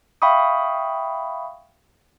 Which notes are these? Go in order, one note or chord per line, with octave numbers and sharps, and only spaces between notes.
E5 F5 G5 B5 C#6 D#6